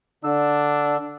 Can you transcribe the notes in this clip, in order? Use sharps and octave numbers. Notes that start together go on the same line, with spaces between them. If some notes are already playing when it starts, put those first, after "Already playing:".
D3 D4 E6